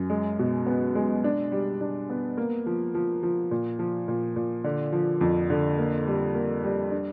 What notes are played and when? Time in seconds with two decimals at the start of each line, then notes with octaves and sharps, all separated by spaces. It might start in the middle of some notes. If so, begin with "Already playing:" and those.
Already playing: F#2
0.10 G#3
0.39 B2
0.67 B3
0.95 G#3
1.24 D4
1.52 G3
1.81 D4
2.10 B3
2.37 A#3
2.66 F3
2.95 F3
3.23 F3
3.51 A#2
3.79 F3
4.08 A#2
4.36 A#2
4.64 D3
4.92 F3
5.21 F2
5.50 D3
5.78 A#3
6.07 G3
6.35 A#3
6.63 G3
6.92 D4